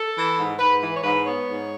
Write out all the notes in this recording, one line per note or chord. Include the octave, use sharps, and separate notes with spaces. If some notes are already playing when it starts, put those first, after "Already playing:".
Already playing: A4
E3
G#2
G#2 B4
E3 B4
C#5
G#2 B4
B3 C#5
G#2